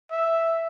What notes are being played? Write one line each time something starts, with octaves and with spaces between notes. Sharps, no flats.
E5